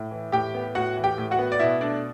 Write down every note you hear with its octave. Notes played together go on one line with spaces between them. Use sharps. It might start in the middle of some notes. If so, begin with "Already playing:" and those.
Already playing: A2
E3
A2 G4 G5
B3
A2 F#4 F#5
E3
G4 G5
A2
F#4 F#5
B3
D5
B2 E4 E5
A3 D4 D5